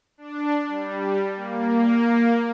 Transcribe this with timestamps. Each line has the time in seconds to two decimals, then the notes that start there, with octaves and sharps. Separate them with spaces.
0.18 D4
0.68 G3
1.36 A#3